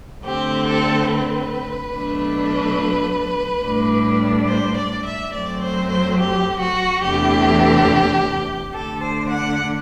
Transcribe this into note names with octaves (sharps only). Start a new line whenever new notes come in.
D3 A3 C4 G4
A4
B4
B2 F#3 A3 D4
A2 G3 D4
C5
D5
E5
F#2 F#3 A3 C4 D5
C5
C5
G4
F#4
E2 C3 E3 A3 D4 G4
D3 A3 D4 A4
C5
F#5